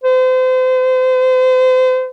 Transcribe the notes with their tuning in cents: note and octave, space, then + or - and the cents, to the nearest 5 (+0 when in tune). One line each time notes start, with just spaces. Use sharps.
C5 -35